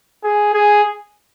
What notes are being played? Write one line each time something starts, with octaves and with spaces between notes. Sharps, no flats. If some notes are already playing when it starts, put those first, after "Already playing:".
G#4
G#4